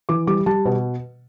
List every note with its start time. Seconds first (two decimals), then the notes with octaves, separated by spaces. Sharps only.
0.09 E3 D6
0.27 G3 D6
0.46 G3 A5
0.66 B2